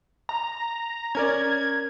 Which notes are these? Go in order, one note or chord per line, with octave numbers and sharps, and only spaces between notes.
A#5
C#4 A#4 D5 G#6